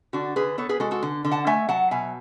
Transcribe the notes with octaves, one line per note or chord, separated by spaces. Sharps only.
D3 D4 F#4
D3 G#4 B4
B3 A4 C#5
G#4 B4
G#3 F#4 A4
F#4 A4
D3
D3
F#5 A5
A3 E5 G#5
F#3 F#5 A5
B2 E5 G#5